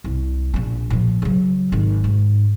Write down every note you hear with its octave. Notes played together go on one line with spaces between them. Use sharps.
C2
A#1 D4
A#2 F3
C#3 F#3
G#1 D#3
G#2